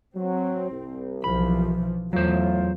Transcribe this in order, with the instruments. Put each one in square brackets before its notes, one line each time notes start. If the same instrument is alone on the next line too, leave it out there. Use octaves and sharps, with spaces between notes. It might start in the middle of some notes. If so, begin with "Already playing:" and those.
[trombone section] F#3 [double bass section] C4
[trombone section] C2
[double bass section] B1 E3 F3 [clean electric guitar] B5
[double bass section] E2 [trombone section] A2 F4 [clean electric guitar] F#3 C5